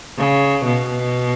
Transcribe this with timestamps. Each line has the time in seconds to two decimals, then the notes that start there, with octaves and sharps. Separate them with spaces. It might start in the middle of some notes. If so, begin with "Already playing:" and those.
0.18 C#3
0.65 B2